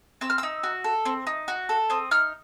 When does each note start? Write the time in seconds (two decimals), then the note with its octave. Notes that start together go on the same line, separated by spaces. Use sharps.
0.21 C4 E6
0.30 F6
0.38 D#4 E6
0.63 F#4
0.84 A4
1.06 C4
1.27 D#4
1.48 F#4
1.69 A4
1.90 C4 D#6
2.11 D#4 F6